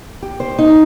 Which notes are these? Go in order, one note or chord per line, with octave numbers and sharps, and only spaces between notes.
G4
C5
D#4